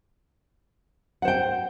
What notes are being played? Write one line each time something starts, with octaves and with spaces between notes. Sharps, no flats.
C5 F#5 G5